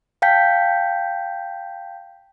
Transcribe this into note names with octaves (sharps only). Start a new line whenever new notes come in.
F5 G5 A5 G6 B6